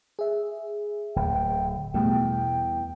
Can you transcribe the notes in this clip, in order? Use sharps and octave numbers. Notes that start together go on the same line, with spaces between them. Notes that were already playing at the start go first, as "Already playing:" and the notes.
G#4 E5
D1 G5
E2 B2 G3 A3 G5